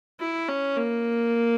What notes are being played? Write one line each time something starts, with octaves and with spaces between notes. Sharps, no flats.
E4
C#4
A#3